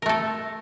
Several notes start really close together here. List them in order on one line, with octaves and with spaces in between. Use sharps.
A#4 A3 A4